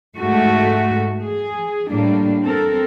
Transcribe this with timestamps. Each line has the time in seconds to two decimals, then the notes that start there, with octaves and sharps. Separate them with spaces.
0.17 G#2 A3 F#4
1.24 G#4
1.91 A2 G3 A#3 D4
2.43 C4 A4 A#4